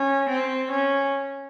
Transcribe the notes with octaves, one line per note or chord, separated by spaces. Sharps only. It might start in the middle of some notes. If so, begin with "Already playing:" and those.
Already playing: C#4
C4
C#4